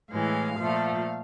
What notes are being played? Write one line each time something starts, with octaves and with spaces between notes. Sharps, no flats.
A2 E3 G#3 F5
A#2 F3 A3